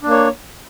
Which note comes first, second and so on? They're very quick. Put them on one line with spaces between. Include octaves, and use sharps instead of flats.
D4 A#3 C#5